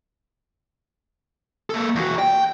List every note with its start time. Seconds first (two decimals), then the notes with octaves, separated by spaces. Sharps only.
1.70 A#3 A4
1.96 E2 F#4
2.19 G5